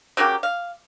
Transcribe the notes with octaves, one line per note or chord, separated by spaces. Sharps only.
C#3 F#3 A#3 G4
F5